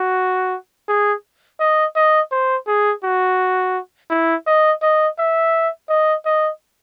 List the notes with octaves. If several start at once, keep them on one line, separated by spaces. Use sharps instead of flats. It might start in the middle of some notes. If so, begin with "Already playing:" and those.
Already playing: F#4
G#4
D#5
D#5
C5
G#4
F#4
E4
D#5
D#5
E5
D#5
D#5